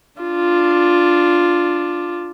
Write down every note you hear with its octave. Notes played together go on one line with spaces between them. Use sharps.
D4 F4